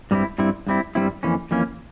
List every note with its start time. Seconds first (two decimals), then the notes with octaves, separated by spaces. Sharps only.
0.11 G2 G3 C4 E4
0.38 G2 G3 C4 E4
0.67 G2 G3 C4 E4
0.95 G2 G3 C4 E4
1.23 F2 E3 A#3 C#4
1.51 F2 E3 A#3 C#4